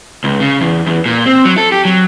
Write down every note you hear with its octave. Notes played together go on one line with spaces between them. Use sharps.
C#2
C#3
E2
E2
A#2
C4
F#3
A4
G4
F#3